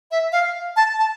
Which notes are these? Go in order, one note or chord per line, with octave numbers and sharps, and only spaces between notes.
E5
F5
A5
A5